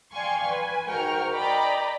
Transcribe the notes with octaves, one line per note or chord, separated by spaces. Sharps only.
D5 F5 G5 G#5 C6 C#6
B4 G#5
G#2 F#4 A#4 G5 C#6 F6
D5 D#5 G5 A#5 B5 D6